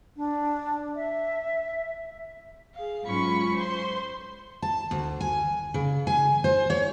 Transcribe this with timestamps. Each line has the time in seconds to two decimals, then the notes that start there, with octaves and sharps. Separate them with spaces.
0.17 D4
0.96 E5
2.75 G#4 F5
3.04 G#2 F#3 C#4 F4 B5 C#6
3.55 C5 C6
4.62 A5
4.91 D2
5.21 G#5
5.74 C#3
6.07 G#5
6.44 C5
6.70 C#5